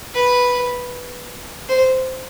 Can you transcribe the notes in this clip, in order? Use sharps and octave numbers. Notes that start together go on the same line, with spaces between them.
B4
C5